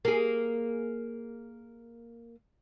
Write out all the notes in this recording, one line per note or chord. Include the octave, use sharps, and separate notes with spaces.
A#3 G#4